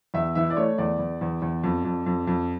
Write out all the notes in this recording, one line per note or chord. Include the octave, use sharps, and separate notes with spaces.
E2 E5
E3 E5
D5
A3 C#5
E2 D5
E2
E2
E2
F2
F2
F2
F2